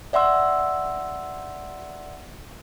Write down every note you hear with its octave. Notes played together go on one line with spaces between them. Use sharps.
D5 E5 F#5 C6 E6